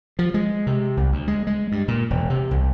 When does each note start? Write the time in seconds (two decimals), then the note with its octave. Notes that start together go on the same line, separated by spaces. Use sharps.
0.19 F3
0.34 G#3
0.67 C3
0.97 C2
1.12 D2
1.28 G#3
1.47 G#3
1.72 G2
1.88 A#2
2.10 E1
2.30 C3
2.51 C2